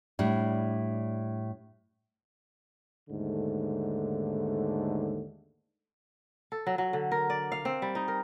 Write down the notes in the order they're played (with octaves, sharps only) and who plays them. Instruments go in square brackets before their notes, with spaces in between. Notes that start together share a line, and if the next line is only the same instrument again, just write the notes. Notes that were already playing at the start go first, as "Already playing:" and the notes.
[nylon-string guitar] A2 G3 D4
[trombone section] D#2 G#2 D3 A3
[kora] A4
F#3
F#3
D3
A#4
D5
F5
C4
G3
D#4
A#4